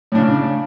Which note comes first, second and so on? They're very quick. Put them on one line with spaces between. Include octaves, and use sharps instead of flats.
A2 D4 C#3